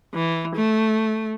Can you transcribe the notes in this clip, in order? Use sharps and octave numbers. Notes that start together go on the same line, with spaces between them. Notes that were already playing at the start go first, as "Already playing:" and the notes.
E3
A3